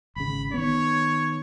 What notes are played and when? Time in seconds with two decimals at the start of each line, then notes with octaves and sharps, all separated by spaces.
0.16 G#1 C#3 B5
0.54 D#3 B3 C#5